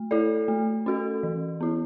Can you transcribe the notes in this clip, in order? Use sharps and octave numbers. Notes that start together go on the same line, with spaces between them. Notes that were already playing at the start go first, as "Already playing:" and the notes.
Already playing: A3
E4 A4 D5
A3
C#4 F#4 A4
E3
B3 E4